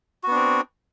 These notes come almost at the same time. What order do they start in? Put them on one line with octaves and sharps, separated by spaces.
F#4 B3 D4 C4